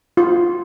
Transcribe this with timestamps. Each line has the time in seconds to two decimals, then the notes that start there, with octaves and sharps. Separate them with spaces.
0.17 F4